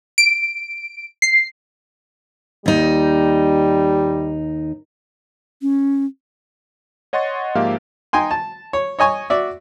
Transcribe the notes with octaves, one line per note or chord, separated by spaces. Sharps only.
D7
C7
D#2 G3 D#4
C#4
C#5 D#5 F#5 C6 C#6 A6
G#2 F3 A#3 G4 E5 F5
D#4 G5 G#5 C6
A5
C#5
C#5 D#5 G#5 C#6
F#4 D5 E5